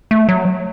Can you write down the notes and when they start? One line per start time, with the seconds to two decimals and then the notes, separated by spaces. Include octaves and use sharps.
0.11 A3
0.29 F#3